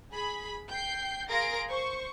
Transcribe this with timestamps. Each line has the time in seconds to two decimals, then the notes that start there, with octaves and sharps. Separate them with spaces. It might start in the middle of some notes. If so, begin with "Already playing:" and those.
0.12 G#4 B5
0.69 G5 G6 C7
1.29 G#4 A#4 F5 C6 A#6 D7
1.68 C5 C#6